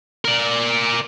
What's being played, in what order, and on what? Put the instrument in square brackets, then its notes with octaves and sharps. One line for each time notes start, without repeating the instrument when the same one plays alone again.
[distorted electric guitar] A#4 D5